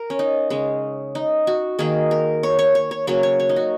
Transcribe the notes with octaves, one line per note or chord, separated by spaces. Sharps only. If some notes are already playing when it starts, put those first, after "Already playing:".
Already playing: A#4
C#4
D#4
C#3 G#3 C#4
D#4
F#4
D#3 A#3 G#4
A#4
C#5
C#5
C#5
C#5
C#3 F#3 A#3 C#5
C#5
C#5
D#4
F#4